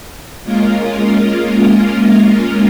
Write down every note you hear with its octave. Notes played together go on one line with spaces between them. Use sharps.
G#3 A#3 C#4 F4 A#4